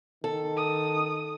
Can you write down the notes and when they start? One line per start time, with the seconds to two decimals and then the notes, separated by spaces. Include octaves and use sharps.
0.24 D#3 A4
0.57 D#6